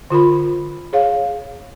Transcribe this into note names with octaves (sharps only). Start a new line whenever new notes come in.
D3 F4 A#4 B5
G#4 C#5 F5